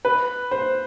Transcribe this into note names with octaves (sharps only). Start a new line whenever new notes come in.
B4
C5